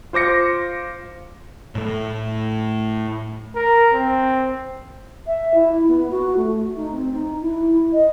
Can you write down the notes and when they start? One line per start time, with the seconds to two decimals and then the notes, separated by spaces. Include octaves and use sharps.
0.13 F4 C5 D6 A#6 C#7
1.75 A2 A3
3.55 A#4
3.94 C4
5.26 E5
5.54 E4
5.87 B3
6.11 F#4
6.36 A3
6.76 D#4
6.91 C4
7.13 D#4
7.41 E4
7.92 D#5